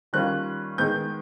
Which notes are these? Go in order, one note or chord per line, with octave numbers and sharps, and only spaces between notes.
D#3 G3 A#3 C#4 F4 F#6
D#3 G#3 B3 G6